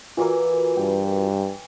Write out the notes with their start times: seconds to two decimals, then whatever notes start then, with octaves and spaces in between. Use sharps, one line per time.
0.17 E3 F4 F#4 A#4 G#5 D6
0.77 G2 G5